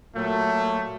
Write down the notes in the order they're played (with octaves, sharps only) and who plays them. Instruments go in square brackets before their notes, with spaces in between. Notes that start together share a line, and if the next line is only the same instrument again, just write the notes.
[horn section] A#2 F#3 A3